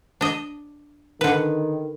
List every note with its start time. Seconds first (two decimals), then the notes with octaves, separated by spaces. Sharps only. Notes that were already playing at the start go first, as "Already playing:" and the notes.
0.21 D4 D#5
1.21 D3 D#3 B4